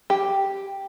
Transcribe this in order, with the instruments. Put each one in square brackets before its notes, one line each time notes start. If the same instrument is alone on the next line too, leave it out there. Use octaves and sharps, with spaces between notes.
[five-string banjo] G4